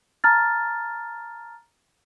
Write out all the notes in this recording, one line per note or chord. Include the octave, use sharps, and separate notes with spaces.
A5 A#5 F6 A6